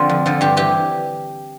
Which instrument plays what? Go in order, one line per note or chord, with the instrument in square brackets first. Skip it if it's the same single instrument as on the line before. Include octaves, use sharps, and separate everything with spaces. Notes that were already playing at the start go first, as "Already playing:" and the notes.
Already playing: [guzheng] D3 F3 C4
F2
D3 F3
G2 G4
E3 G4